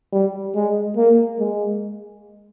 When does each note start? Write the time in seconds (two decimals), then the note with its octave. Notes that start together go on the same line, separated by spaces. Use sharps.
0.13 G3
0.55 G#3
0.97 A#3
1.39 G#3